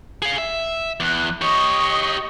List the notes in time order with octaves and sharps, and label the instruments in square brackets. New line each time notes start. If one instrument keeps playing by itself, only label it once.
[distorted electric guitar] G#4 F5
E5
[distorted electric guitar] E2 [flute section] F#6
[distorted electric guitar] G4 C#5 [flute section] D#5 C#6 D#6